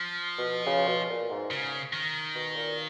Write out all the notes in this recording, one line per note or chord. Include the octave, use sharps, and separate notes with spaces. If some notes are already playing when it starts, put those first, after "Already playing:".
Already playing: F3
B2
C#3
B2
A#2
G#2
C#3
D#3
B2
A#2